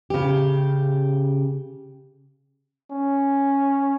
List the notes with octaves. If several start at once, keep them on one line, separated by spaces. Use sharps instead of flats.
C#3 G4
C#4